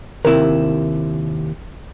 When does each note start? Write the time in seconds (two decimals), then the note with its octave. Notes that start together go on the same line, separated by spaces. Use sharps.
0.25 D#2 C3 E4 A#4